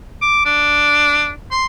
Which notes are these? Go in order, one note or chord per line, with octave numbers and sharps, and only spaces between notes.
D6
D4
C6